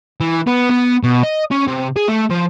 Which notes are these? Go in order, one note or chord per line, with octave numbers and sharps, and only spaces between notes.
E3
B3
B3
B2
D#5
C#4
C3
G#4
A3
F3